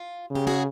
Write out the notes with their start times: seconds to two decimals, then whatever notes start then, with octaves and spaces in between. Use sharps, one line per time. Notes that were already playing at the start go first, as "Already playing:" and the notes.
Already playing: F4
0.31 C#3 G4
0.47 F#4 G#4